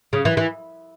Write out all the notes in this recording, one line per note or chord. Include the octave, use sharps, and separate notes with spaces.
C#3
E3
E3